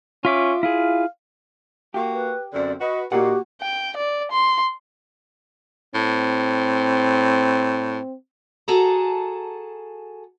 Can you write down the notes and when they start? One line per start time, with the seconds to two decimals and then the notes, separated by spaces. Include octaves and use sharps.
0.25 C#4 F4 E5 D6
0.63 E4 F4 G#4 F5
1.94 A#3 F#4 G4
2.13 B4
2.53 F#2 D3 C4 D5
2.81 F#4 B4 D#5
3.12 A#2 A#3 D#4 F#4 G4 F#5
3.61 G5
3.97 D5
4.31 C6
5.95 A2 C4
8.68 F#4 G#4 A4 A5 A#5